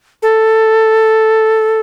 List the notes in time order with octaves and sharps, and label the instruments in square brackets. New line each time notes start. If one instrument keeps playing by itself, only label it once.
[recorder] A4